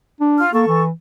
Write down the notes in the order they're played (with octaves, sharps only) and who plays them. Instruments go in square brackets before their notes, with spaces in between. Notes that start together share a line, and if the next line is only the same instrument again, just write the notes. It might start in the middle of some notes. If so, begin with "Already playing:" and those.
[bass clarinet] D4
[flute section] F4 F6
[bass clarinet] A#3 [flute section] A4 C#6
[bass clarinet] E3